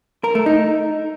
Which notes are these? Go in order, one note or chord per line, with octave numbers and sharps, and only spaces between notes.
A#4
A3
D#4